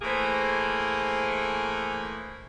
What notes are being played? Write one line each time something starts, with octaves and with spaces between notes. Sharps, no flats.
E3 A3 A#3 G#4 C5